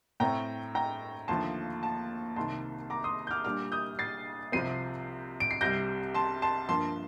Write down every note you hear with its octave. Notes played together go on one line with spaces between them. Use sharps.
A2 A3 C4 G5 A#5
G5 A#5
D#2 D3 F3 A3 A5 C6
A5
C2 C3 D#3 A5 C6
A#5 D6
C6 D#6
G6
D6 F6
A#2 G3 D4 D6 F6
D#6 G6
A6 C7
C2 C3 F3 C4 C7 D#7
D7
C7
C2 C3 G3 G6 A#6
A5 C6
A5 C6
G2 F3 A#3 A5 C6